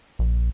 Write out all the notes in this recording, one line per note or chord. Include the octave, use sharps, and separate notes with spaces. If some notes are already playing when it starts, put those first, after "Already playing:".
A#1